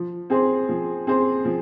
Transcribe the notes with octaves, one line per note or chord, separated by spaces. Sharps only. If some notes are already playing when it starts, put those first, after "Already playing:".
Already playing: F3
C4 G#4 C5
F3
C4 G#4 C5
F3